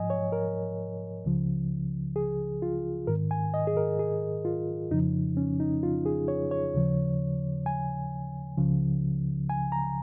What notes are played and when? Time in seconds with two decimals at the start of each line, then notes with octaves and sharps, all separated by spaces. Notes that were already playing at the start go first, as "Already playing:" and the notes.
Already playing: G#2 F3 D#5 G#5
0.10 C#5
0.32 A#4
1.25 C#2 C#3 F3
2.16 G#4
2.62 F4
3.07 G#2 D#3 A#4
3.31 G#5
3.54 D#5
3.67 G#4
3.77 A#4
3.99 G#4
4.45 F4
4.91 F2 C#3 F3 D#4
5.37 C#4
5.60 D#4
5.83 F4
6.06 G#4
6.28 C#5
6.51 C#5
6.74 D#2 C#3 F3
7.66 G#5
8.58 C#2 C#3 F3
9.50 G#5
9.72 A#5